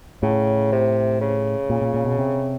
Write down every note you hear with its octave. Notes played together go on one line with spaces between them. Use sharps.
A2 C#3
C3
C#3
A#2
A#2
A#2
B2
C3